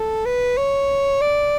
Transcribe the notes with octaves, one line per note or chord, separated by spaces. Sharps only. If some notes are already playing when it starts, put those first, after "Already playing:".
Already playing: A4
B4
C#5
D5